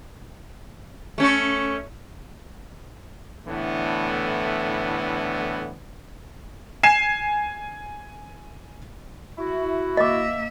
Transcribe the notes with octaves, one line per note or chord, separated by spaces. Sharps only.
A3 C#4 A4
A2 D3 E3 A3 B3 D4
G#5 C7 E7
E4 F#4
A#3 D#5 E5 D6